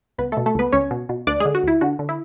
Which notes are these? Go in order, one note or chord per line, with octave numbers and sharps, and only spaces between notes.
C#2 B3 B4
B2 A3 A4
A3 A4
C#2 B3 B4
C#2 C#4 C#5
B2
B2
D2 D4 D5
D3 G#3 G#4
F#4
D2 E4
D3 F#4
D3
E4